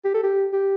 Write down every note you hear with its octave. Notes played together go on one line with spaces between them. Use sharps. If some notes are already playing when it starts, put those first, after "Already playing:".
G4
A4
G4
G4